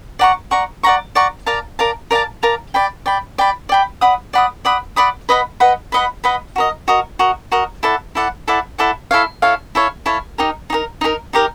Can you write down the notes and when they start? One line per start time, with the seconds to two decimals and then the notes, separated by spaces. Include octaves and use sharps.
0.19 D5 F#5 A#5 C#6
0.51 D5 F#5 A#5 C#6
0.83 D5 F#5 A#5 C#6
1.15 D5 F#5 A#5 C#6
1.46 A#4 D5 F5 A5
1.79 A#4 D5 F5 A5
2.11 A#4 D5 F5 A5
2.43 A#4 D5 F5 A5
2.74 D5 G5 B5
3.06 D5 G5 B5
3.38 D5 G5 B5
3.69 D5 G5 B5
4.01 D5 F#5 B5 D#6
4.33 D5 F#5 B5 D#6
4.65 D5 F#5 B5 D#6
4.96 D5 F#5 B5 D#6
5.29 B4 D#5 F#5 B5
5.60 B4 D#5 F#5 B5
5.92 B4 D#5 F#5 B5
6.24 B4 D#5 F#5 B5
6.56 F#4 A#4 D#5
6.88 F#4 A#4 D#5
7.19 F#4 A#4 D#5
7.52 F#4 A#4 D#5
7.83 E4 A4 D5 F#5
8.15 E4 A4 D5 F#5
8.48 E4 A4 D5 F#5
8.78 E4 A4 D5 F#5
9.11 E4 A4 C#5 F5
9.42 E4 A4 C#5 F5
9.75 E4 A4 C#5 F5
10.06 E4 A4 C#5 F5
10.38 D#4 G4 A#4
10.70 D#4 G4 A#4
11.01 D#4 G4 A#4
11.33 D#4 G4 A#4